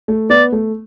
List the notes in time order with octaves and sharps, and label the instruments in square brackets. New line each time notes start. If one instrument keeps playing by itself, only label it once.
[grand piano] A3
[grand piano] B3 [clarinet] D5
[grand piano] A3